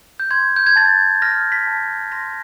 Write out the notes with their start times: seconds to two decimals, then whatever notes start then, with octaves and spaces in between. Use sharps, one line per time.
0.20 G6
0.31 C6 G#6
0.56 G6
0.66 G#6
0.76 A5 A6
1.22 F6 A#6
1.52 B6
1.67 A5
2.12 C6 A#6